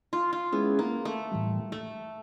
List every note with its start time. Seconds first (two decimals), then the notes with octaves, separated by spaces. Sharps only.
0.13 F4
0.33 F4
0.52 G#3 B3 C#4 E4 G#4
0.79 A#3
1.05 A3
1.32 A2 E3 G3
1.72 A3